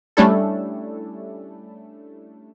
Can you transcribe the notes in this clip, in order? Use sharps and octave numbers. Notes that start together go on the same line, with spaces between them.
G3 A3 C#4 D4 E4 A4